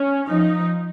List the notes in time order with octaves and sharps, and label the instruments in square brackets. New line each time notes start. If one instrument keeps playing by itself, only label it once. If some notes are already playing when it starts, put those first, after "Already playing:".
Already playing: [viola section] C#4
[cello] F3 [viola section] D#4